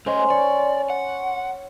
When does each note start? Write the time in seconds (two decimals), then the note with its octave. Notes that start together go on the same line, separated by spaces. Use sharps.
0.06 A3 C#4 C5 D#5
0.30 C#5 D5
0.90 F#5